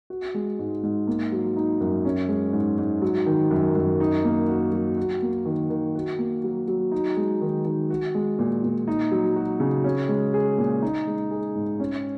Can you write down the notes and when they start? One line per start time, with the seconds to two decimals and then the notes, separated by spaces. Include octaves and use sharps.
0.10 F#4
0.34 G#3
0.59 G#2
0.83 G#2
1.07 A#3
1.32 F#3
1.57 D#4
1.81 F#2
2.05 C#4
2.29 G#3
2.53 G#2
2.78 G#2
3.02 F#3
3.26 D#3
3.51 F#2
3.75 F#2
4.00 D#4
4.25 A#3
4.48 F#4
4.72 F#3
4.97 F#4
5.22 A#3
5.45 D#3
5.70 D#3
5.95 F#4
6.19 A#3
6.44 F#3
6.68 F#3
6.92 D#4
7.17 G#3
7.41 D#3
7.65 D#3
7.90 F#4
8.15 G#3
8.39 A#2
8.63 A#2
8.88 D#4
9.12 F#3
9.36 F#4
9.60 C#3
9.84 C#4
10.09 G#3
10.34 G#4
10.58 A#2
10.82 D#4
11.07 G#3
11.31 G#4
11.55 G#2
11.80 C#4